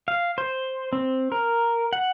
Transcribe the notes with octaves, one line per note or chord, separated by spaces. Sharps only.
F5
C5
C4
A#4
F#5